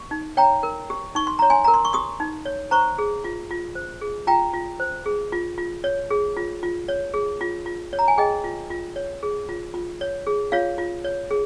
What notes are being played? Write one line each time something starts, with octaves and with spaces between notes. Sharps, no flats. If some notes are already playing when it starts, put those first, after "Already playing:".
Already playing: G4
D#4
C#5 G5 A#5
A#4
G4
D#4 C#6
C6
C#5 A#5
G#5 C6
A#4 A#5
C6
C#6
G4 C6 D#6
D#4
C#5
C5 A#5 C#6
G#4
F4
F4
C5
G#4
F4 G5 A#5
F4
C5
G#4
F4
F4
C#5
G#4
F4
F4
C#5
G#4
F4
F4
C#5
A#5
G#5
G#4 D#5 G5
F4
F4
C#5
G#4
F4
F4
C#5
G#4
F4 C#5 F5
F4
C#5
G#4